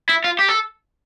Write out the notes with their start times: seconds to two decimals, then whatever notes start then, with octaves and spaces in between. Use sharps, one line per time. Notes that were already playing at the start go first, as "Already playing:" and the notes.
0.09 E4
0.24 F4
0.39 G4
0.48 A4